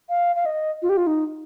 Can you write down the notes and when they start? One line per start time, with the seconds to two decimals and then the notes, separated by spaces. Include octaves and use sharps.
0.09 F5
0.36 F5
0.45 D#5
0.82 F4
0.89 G4
0.97 F4
1.07 D#4